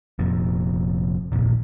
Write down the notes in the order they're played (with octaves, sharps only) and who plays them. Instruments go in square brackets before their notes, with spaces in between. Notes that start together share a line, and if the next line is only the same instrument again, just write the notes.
[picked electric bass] F1 F2 A#2
D#1 A#1 F2